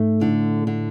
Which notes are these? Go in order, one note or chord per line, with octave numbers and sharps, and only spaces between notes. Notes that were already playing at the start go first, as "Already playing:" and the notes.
Already playing: G#2 A3
A2 D3
D3